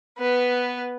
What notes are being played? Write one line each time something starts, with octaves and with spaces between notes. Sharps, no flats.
B3 B4